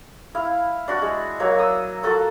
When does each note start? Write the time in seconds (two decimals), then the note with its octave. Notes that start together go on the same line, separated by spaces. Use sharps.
0.35 E4 F5
0.88 D4 F#4
1.02 G#3
1.40 F#3 A#3
1.58 D#6 E6
2.03 F4 F#4 A4 A#5